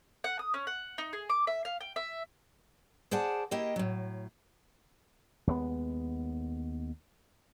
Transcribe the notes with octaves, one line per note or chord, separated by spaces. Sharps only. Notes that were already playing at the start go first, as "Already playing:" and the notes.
F#5
D#6
C#4
F#5
D#4
G#4
D6
E5
F5
G5
E5
G#4 C5 D5 F#5 A5
A#3 E4 G4 D#5 G5
A2 F#3
D#2 G#3 B3